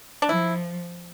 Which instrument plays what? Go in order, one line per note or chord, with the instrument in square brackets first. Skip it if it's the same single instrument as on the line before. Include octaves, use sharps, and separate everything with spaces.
[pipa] D4
[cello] F3 [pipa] E4